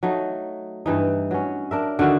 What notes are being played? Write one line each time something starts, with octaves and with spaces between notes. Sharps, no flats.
F#3 A3 D#4
G2 E3 D#4
F#3 C#4
D4 A#4 E5
D3 D#3 F#4 E5